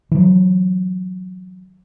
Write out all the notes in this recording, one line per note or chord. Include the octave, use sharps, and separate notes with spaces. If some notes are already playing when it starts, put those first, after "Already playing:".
E3 F#3